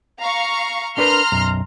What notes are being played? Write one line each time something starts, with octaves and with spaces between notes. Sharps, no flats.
F5 A#5 C#6
D4 A#4 B4 A#5 C6 F6
B1 F#2